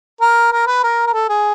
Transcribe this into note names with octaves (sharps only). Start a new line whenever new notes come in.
A#4
A#4
B4
A#4
A#4
A4
G#4